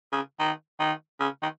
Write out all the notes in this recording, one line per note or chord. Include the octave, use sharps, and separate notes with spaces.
C#3
D#3
D#3
C#3
D#3